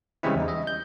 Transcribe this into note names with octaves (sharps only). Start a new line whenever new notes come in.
C#3 E3 G3 G#3 C4 E4
E2 G3 D#4
D#5 E5
G6